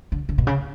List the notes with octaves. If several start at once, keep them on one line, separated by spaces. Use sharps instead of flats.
D3
D3
B2
C#3